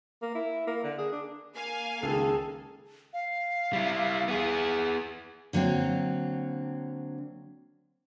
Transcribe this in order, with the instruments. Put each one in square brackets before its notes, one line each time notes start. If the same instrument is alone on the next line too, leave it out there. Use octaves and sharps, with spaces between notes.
[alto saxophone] A#3
E4
A#3
D3
G#4
D4
[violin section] A#3 F5 G#5
[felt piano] C#2 D#3 [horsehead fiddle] G#4 A4
[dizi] F5
[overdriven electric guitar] G3 E4
B3 G#4
[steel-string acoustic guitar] D3 F#3 A#3 C4